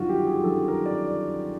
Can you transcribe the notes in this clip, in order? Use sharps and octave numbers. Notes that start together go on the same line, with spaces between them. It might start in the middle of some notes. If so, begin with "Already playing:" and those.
Already playing: G1 F#2 D#3 F4 F#4
G4
G#4
G1 F#2 D#3 A4
A#4
D5